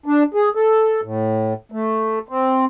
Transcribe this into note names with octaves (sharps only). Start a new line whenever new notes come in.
D4
G#4
A4
A2
A3
C4